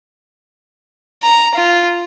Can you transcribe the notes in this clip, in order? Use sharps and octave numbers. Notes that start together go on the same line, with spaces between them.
A#5
F4